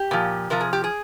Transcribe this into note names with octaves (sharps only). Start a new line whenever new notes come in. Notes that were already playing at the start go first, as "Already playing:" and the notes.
Already playing: G4
A#2 F3
C3 F3 A#4
G#4
G4
G#4